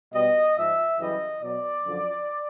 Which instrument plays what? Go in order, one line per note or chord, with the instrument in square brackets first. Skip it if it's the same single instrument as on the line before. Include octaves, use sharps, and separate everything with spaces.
[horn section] B2 G3 D#5
G#2 F3 E5
F#2 C#3 E3 G3 D#5
B2 F#3 D5
F#2 D3 F3